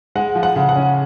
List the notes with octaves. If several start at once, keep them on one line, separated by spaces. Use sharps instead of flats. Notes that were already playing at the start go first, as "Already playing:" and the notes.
G#3 F#5
F3
F#5
C#3
F#5
C#4